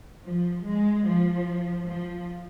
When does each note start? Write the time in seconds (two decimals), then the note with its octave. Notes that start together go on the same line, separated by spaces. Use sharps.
0.24 F3
0.64 G#3
1.06 F3
1.87 F3